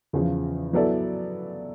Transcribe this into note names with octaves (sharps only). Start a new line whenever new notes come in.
E2 C#3 F3
F#3 B3 E4 A4 D5